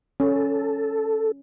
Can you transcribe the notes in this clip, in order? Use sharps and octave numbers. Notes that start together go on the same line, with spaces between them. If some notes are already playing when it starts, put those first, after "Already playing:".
C#4 A4